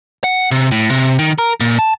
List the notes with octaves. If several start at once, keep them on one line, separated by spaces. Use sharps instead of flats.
F#5
C3
A2
C3
D#3
A#4
A#2
A5